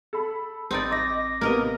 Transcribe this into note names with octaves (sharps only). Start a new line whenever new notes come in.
A4 B5
A1 C4 D#4 D5
D#5 D6 A#6
A2 C3 A#3 B3 A#4 D#5